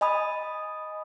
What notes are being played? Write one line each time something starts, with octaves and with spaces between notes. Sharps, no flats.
D#5 G#5 B5 D#6